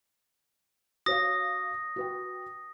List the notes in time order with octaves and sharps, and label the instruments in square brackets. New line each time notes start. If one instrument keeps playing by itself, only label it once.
[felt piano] F#4 C#5 F5 [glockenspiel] D#6 A#6
[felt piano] F#4 B4 G5